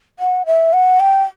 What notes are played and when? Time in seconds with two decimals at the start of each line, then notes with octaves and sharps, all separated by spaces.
0.19 F#5
0.46 E5
0.73 F#5
1.00 G5